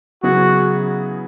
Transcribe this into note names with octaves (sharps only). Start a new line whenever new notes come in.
C#3 F#3 B3 E4 F#4 G#4